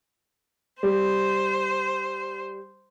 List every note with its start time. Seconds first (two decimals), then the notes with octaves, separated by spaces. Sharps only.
0.83 G3 C5